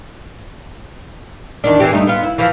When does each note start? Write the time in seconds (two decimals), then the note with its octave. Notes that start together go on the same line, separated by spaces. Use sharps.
1.64 E2 D#3 D4
1.80 E3 C4 G4
1.91 G2 A3 D#4
2.07 B3 F4
2.23 E4
2.38 E3 F3